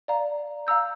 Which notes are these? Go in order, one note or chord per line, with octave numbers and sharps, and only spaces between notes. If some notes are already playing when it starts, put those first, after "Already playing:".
D5 F5 A#5
F5 A#5 E6 G6